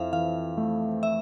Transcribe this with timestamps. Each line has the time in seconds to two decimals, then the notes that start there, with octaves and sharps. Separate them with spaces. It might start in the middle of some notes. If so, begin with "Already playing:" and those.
Already playing: F2 E4 C5 E5 F5
0.13 E3 F5
0.57 A3
1.03 E5